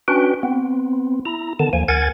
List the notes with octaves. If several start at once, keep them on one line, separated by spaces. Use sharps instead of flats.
C#4 D4 F#4 B4 G5
B3 C4
E4 A#5
D3 D#3 B3 A5
D#2 F3 A#3 G#5
D2 A#4 F#5 G#5 G#6 A6